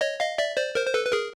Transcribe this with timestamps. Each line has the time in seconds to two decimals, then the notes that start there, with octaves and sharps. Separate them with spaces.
0.01 C#5 D#5
0.20 D#5 F5
0.38 D5 E5
0.57 C5 D5
0.75 A#4 C5
0.86 C5
0.94 A4 B4
1.05 B4
1.12 G#4 A#4